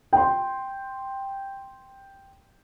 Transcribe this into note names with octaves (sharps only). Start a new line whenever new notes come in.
G5 C6